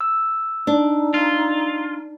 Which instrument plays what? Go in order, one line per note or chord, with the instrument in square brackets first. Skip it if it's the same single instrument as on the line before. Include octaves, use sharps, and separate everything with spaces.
[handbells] E6
[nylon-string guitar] D4 [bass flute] D#4
[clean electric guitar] F4